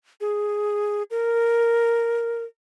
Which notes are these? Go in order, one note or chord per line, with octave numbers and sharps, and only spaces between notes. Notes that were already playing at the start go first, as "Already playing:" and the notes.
G#4
A#4